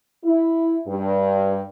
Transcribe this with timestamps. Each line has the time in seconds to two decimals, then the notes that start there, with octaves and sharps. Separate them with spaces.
0.24 E4
0.88 G2